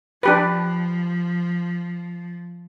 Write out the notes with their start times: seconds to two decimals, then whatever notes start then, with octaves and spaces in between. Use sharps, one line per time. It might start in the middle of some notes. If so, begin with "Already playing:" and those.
0.23 F3 D4 G4 B4